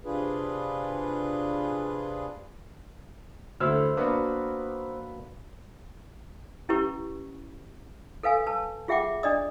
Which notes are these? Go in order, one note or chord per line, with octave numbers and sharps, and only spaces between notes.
C3 D4 F4 G#4 B4
D2 D3 E4 C5 E6 F6
A#3 B3 D4 F#4 B4
C#4 E4 G4 B4 C#6
A4 B4 F5 G#5
B4 A5
F4 G#4 E5 F#5 G5 D6
D4 D5 D#5 D#6